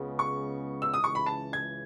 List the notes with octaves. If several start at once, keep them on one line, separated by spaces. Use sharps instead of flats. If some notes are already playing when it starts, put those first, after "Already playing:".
Already playing: C#2 C#3 G#3 B3
C#6
E6
D#6
C#2 C#3 E3 C#6
B5
A5
G#6